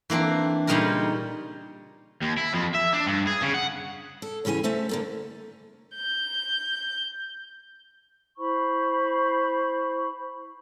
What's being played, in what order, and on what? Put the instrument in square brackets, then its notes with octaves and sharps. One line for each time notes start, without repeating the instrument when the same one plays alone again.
[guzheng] E3 A#3 C4 D4
A#2 C#3 G3 D#4 A#4 A#5
[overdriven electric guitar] D#2
E4
F2
E5
D4
G2
G#4
C#3
F#5
[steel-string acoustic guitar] A4
E2 C#3 C#4 C5 G#5
A3 C#4 C5 E5 A5
D3 A#3 A4
[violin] G6
[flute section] E4 C5 B5 C#6